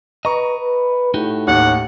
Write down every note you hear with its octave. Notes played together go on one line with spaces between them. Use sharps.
B4 D#5 A#5 C#6
B4
A2 D#4 F#4 G4
A1 D#2 F#5